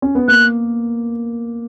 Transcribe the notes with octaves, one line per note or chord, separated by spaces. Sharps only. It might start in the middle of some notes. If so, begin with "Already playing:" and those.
C#4
B3
A#3 F#6